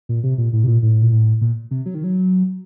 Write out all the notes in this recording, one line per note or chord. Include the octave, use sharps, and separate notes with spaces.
A#2
C3
A#2
A2
C3
A#2
A2
A#2
A2
A#2
C3
F#3
D#3
F#3